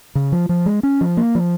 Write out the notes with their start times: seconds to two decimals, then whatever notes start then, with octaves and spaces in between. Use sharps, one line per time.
0.15 C#3
0.32 F3
0.49 F3
0.66 G#3
0.83 C#4
1.01 F3
1.17 A#3
1.35 F3